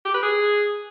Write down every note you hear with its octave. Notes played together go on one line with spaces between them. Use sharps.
G4
B4
G#4